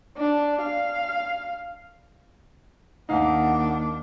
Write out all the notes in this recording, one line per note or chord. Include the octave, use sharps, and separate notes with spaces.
D4
F5
D#2 D4 D#4 F5 F#5